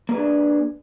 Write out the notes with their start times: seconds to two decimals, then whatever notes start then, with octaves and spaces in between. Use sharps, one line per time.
0.09 A#3
0.12 B4
0.15 G#4
0.18 D4